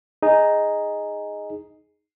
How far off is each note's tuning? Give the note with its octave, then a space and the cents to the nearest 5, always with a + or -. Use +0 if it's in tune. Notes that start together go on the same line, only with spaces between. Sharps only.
D#4 +0 G#4 +0